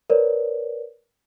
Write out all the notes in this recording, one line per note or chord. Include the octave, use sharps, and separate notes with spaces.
A#4 B4 C#5 D5